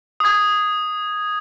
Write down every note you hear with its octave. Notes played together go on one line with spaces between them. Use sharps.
D#6 G#6